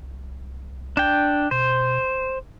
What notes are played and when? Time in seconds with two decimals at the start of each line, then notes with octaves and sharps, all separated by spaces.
0.01 C2
0.97 D4 G5
1.51 B2 C5
2.07 E1